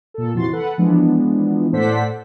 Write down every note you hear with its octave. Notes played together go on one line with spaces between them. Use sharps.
A#2 A4
F2 C3 E3 F#4 C6 A6
A4 B4 F#5
E3 F3 G#3 B3 D4
A2 A4 C5 D5 F#5 B6